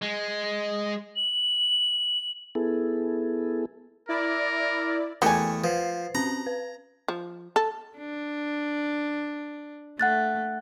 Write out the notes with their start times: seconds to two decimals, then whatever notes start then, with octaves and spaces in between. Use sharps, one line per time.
0.02 G#3
1.16 F#7
2.55 B3 E4 G#4 A4
4.09 E4 A#4 D5
5.22 E2 G3 A3 A#3 F#4 G4 G#5 C#6
5.64 F3 B4 C5 C7
6.15 C4 C#4 A5 A#5
6.46 B4
7.08 F3
7.56 A4
7.98 D4
10.00 A3 F#5 F#6 A6